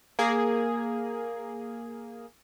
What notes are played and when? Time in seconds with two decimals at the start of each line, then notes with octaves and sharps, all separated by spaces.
0.19 A#3 G#4